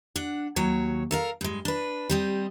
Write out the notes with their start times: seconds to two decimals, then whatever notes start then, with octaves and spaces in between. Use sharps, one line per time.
0.16 D4 F#5
0.56 D#2 F#3 C#5
1.11 A4 A#4 F5
1.41 G2 G#3
1.65 D4 B4
2.10 G3 C4 D#5